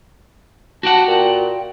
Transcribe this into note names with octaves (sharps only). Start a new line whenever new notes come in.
F#4 G4 F#5 A5
A#2 G5